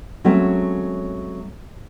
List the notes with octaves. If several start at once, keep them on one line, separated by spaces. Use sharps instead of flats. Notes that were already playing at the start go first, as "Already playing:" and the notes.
F#3 G#3 A3 C4 C#4